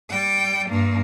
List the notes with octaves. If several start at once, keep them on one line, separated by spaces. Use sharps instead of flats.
G3 G5
G2 A#3